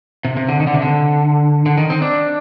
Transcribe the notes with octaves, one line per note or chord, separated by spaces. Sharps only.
C3
C3
D3
D#3
D3
C3
D3
D3
D#3
C4
D4